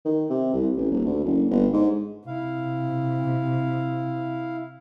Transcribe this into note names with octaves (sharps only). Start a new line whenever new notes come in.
D#3
C3
C2
A1
D#1
D2
F#1
G1
G#2
C3 E4 F5